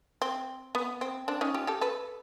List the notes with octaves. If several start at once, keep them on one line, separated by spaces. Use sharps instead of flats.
C4
B3
C4
C4 D4
C#4 D#4
F4 G4
G4 A4
A4 B4